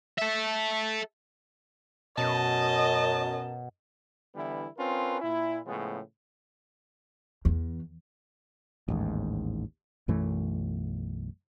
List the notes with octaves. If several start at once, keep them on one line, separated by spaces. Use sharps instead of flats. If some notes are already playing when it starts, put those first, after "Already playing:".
A4 E5
F#2 B2 D#5 A5
D3 E3 G3 B3 E4
C4 C#4 F4 A#4 B4
A#2 E4
A2 C#3 F3 G#3 B3
E2
A1 D#2 G#2
B1 F#2 E3 A3